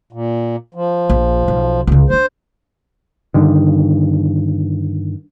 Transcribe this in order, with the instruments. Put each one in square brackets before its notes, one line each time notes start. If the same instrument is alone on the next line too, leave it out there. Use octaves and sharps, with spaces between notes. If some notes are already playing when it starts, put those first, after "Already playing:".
[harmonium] A#2
F3
[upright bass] A#1
B1
C#2 C#3
[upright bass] F3 D4 [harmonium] C5
[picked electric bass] G2 D3 D#3